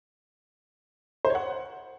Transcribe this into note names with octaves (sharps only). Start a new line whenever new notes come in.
C5
C#5
F#5